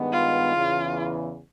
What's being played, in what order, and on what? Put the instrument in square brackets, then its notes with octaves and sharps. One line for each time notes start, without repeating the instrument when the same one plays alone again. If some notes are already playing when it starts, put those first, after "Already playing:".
Already playing: [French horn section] G2 D#3 G#3 B3
[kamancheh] F4
[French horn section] E2 C#3 E3